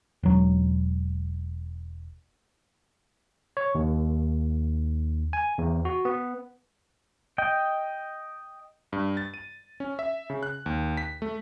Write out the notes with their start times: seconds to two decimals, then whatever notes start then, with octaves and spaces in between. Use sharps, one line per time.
0.23 E1 F#3
3.57 C#5
3.75 D#2
5.33 G#5
5.58 E2
5.85 F#4
6.05 B3
7.38 D#5 G5
8.93 G2
9.17 A6
9.34 D#7
9.80 C#4
9.99 E5
10.30 C#3
10.43 F#6
10.66 D#2
10.97 B6
11.22 A3